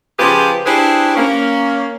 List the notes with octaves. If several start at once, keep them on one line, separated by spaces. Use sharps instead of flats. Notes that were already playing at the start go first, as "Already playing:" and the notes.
C#3 F3 F4 G4 G#4 B4
D4 E4 G4 G#4 B4 C5
A#3 C#4